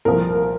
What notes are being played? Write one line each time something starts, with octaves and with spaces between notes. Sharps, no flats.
C2 A#2 F3 A#4